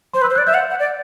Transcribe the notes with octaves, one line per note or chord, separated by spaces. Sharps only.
C5 C6
B4 E6
C5
D5 F#6
E5 G6
F#5
F#5
D5